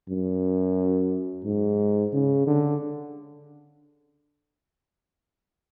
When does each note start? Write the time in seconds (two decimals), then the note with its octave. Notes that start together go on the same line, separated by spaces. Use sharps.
0.09 F#2
1.45 G#2
2.13 C#3
2.47 D3